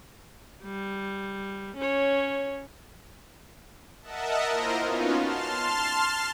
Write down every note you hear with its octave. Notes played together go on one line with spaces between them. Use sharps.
G3
C#4 C#5
A#4 D#5 E5 F#5 A5
A#3 E4 F4 A#4 C5 D#5
B3 C#4 D#4 F4 F#4
A5 C6 F6